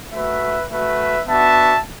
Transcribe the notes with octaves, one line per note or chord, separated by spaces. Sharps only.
A3 F#4 B4 E5
A3 F#4 B4 E5
B3 D4 F#4 E5 A5